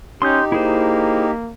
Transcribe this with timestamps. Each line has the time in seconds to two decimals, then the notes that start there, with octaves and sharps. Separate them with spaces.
0.22 C#4 D#4 G4 C6 D#6 G6
0.52 A#3 E4 G#4 C5